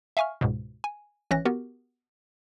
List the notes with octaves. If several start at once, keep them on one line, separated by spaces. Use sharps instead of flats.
E5 F5 G#5 C#6 F6
C#2 G#2 B2
G#5
G#1 E3 C#4 C#5 F#6 A#6
B3 F#4 G4 A#4